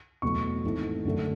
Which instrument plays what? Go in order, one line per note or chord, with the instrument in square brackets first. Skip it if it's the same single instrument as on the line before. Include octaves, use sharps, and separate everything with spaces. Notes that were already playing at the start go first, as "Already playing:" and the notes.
[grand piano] E2 B2 F#3 A3 C#6
G#1 G#2 E3 A3
F#2 D3 A3